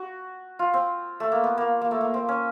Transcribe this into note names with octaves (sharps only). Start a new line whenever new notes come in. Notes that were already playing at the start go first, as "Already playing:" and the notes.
Already playing: F#4
F4
C4
A3
A#3
B3
A#3
A#3
A3
A#3
C4
C#4